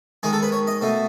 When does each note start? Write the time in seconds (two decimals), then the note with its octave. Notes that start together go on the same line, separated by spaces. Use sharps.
0.23 D#3 G#3 G#4
0.33 A4
0.43 B4
0.52 C#5
0.67 D#5
0.81 B2 A3